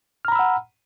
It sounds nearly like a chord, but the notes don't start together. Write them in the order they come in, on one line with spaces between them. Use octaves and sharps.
F6 A#5 B5 E6 F#5